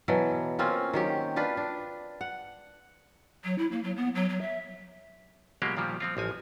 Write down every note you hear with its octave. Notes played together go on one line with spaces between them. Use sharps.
B2 E3 F#3
A#3 C4 C#4 F4
D#3 F#3 G4
D4 F4 B4
D4
F#5
F#3
E4
A#3
F#3
B3
F#3
F#3
E5
B2 F#3 G#3 A#3 F4 G4
A#2 D#3 F3 G3
F3 C4 F4
A1 F3 G#5